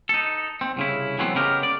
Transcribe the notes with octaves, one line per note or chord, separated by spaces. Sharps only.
D#4 A4
C4
C2 C#3 E4
E3 F#3 A3 B3 C4
C#3 G#3 B3 G4 A#4
D5